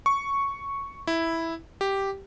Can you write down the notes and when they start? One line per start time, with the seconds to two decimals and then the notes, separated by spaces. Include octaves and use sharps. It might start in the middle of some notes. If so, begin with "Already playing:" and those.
0.06 C#6
1.07 E4
1.81 G4